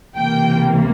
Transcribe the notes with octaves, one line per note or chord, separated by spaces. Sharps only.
C#2 C3 E3 A#3 G5